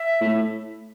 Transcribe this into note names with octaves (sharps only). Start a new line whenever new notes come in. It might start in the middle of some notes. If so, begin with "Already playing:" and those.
Already playing: E5
A2